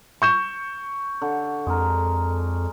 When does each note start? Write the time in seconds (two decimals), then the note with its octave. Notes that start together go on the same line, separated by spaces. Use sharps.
0.22 C#6 G6 E7
1.22 D3
1.67 F2 G#3 A#4